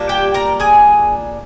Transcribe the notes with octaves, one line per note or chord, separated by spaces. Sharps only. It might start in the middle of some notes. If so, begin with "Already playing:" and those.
Already playing: G3 A#3 D4 F4
G4 G5
A#4 A#5
G#4 G#5